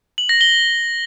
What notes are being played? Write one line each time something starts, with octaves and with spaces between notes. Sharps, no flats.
F#7
A#6
G7